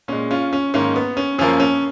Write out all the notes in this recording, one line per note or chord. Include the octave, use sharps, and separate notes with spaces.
A#2 G#3 C#4
C#4 F4
C#4
G#2 D#3 A#3 C#4
B3
C#4
F#2 F3 A#3 C#4
C#4